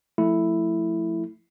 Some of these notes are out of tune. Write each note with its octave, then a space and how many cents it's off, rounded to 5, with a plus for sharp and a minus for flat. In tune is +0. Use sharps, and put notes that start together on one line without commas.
F3 +0 A3 +0 E4 +0